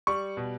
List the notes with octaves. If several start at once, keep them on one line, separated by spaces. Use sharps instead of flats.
G3 C#6
B2